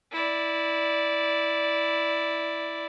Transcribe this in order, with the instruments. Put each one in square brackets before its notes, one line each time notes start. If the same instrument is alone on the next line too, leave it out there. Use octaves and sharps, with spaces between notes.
[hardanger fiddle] E4 D5